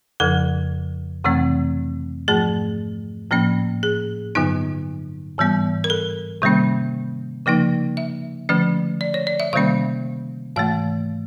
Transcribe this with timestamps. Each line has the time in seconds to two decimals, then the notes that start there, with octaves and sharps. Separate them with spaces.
0.20 F2 C#3 F3 A4
1.24 F2 C3 E3 A3 C4
2.28 G#2 F3 A3 G#4
3.31 A2 F3 A#3 C#4
3.83 G#4
4.35 G2 D3 F#3 B3 D#4
5.38 G#2 E3 G3 B3
5.84 A#4
5.90 A4
6.42 C3 D#3 G3 A#3 C#4
7.46 C#3 F3 A#3 D#4
7.97 E5
8.49 D3 F3 A3 C#4
9.01 D5
9.14 C#5
9.27 D5
9.40 E5
9.53 C3 D#3 G3 A#3 C#4 F5
10.56 G#2 E3 A3 F5